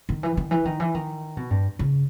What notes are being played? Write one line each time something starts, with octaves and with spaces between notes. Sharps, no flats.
D#3
E3
D#3
E3
D#3
E3
D#3
B2
G2
C#3